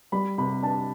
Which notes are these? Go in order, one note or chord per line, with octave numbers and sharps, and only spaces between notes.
G3 B5
C3 B5
D4 A5